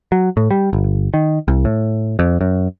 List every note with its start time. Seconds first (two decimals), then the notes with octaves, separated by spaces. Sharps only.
0.12 F#3
0.37 A2
0.51 G3
0.73 G1
1.14 D#3
1.48 C2
1.65 A2
2.19 F2
2.41 F#2